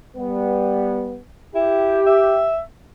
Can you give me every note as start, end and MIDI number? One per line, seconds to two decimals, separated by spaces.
0.16 1.20 55
0.16 1.20 59
1.55 2.01 64
1.55 2.48 67
2.06 2.59 76